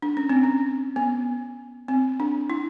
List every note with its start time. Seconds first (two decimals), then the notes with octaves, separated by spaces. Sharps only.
0.02 D4
0.17 C#4
0.29 C4
0.43 C#4
0.96 B3
1.88 C4
2.20 D4
2.50 E4